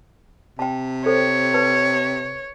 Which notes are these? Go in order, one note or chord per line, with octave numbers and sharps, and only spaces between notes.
C3 G5 A5
A4 C5 C#5 G5
B4 A5